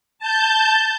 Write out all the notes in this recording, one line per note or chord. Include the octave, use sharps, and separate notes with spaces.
A5 G6